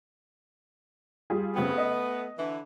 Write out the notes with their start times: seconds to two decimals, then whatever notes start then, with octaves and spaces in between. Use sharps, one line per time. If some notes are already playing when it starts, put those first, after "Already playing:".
1.30 G3 F4 G#4
1.56 C#3 A3 B3 C4 G4
1.78 D#5
2.38 D3 E3